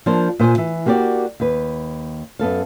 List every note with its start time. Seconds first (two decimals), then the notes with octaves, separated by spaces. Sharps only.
0.06 F3 A#3 D4 C5
0.39 A#2 C5 D#5 G#5
0.58 E3
0.86 A#3 F#4 G4 C5 D5 F#5
1.40 D#2 B4
2.39 F#2 B3 A4 F5